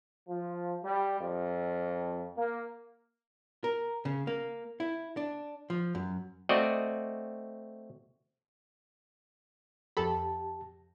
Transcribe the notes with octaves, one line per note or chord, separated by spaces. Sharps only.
F3
G3
F2
A#3
A#4
C#3
A#3
E4
D4
F3
F#2
A3 C4 F#4 D5 D#5
F2 G4 A4 A5 B5